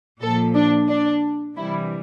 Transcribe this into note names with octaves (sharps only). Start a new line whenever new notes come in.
A#2 F3 A4
D4
D4
C3 E3 G3 E4